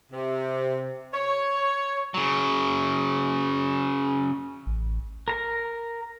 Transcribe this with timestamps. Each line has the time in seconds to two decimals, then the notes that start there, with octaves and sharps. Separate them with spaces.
0.12 C3
1.13 C#5
2.14 C#3 F#3
4.66 A1
5.28 A#4 A#5